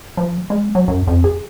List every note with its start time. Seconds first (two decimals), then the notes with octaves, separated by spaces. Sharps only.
0.17 F3
0.50 G#3
0.75 F#3
0.88 F#2
1.07 F2
1.24 G#4